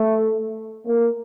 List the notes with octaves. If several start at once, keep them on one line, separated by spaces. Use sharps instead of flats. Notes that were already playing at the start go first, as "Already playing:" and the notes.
Already playing: A3
A#3